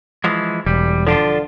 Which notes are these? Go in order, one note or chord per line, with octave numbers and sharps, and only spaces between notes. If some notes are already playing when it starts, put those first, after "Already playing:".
E3 F3 G#3
E1 G3
D3 F3 D4 F4